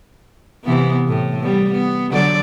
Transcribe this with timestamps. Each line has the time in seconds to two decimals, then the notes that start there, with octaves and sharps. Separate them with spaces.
0.65 C3 E3 B3
1.08 A2
1.40 G3 B3
1.72 B3
2.11 D3 F#3 D5